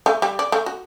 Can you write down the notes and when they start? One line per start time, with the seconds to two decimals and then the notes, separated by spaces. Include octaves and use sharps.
0.06 A3
0.22 G3
0.39 D5
0.52 A3
0.66 F#4